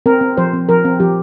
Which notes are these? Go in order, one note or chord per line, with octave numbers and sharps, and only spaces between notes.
C4 A#4
C4
F3 C5
C4
F3 A#4
C4
F3 G4